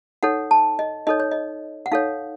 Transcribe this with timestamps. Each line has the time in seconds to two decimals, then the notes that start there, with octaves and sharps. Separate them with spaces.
0.23 D#4 A4 C#5 F#5
0.51 A5
0.79 D#5
1.07 D#4 A4 C#5 D#5
1.20 C#5
1.31 D#5
1.86 F#5
1.92 D#4 A4 C#5 F5